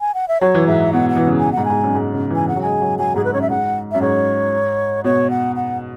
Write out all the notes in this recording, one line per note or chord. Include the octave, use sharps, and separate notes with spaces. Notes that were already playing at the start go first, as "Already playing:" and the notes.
G#5
F#5
E5
F#3 C#5
E3
G#2 E5
B2 F#5
F#5
E3
C#3
B2 G#5
G#2 F#5
G#2 G#5
F#2
G#2
C#3
E3
G#5
C#3 F#5
F#3
G#3 G#5
F#3
F#3 G#5
G#2 G#4
B4
F#2 C#5
E5
G#2 F#5
F#2 E5
G#2 C#5
B2 C#5
F#5
F#5